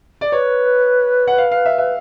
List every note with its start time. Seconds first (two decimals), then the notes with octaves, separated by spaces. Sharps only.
0.21 D5
0.32 B4 C#5
1.28 F#5
1.38 F5
1.51 F5
1.65 E5
1.78 E5